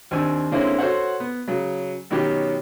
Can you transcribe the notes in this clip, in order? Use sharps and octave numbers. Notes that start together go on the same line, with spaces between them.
D#2 C4 D4 G#5 E6
D3 G#3 A#3 C4 C#4 E4
F#4 A4 C5 C#5 F#5
B3
C#3 F#3
B2 D#3 F#3 C#4 G4